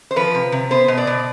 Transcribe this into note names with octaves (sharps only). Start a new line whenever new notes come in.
C5
F3 B4
C3
C3
B3 C5
B2
D5
B2